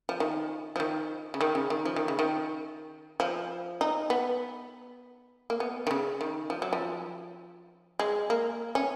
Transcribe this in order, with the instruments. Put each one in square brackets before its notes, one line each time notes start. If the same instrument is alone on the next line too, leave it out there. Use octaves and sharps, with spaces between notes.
[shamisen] F3
D#3
F3
D#3
C#3
D#3
C#3
D#3
F3
D#3
C#3
D#3
F3
D#4
B3
A#3
B3
D#3
C#3
D#3
F3
F#3
F3
G#3
A#3
C#4